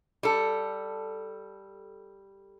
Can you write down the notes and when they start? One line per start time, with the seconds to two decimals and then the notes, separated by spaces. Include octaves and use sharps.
0.23 G3 A4